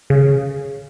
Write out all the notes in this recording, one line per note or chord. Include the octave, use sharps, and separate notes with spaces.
C#3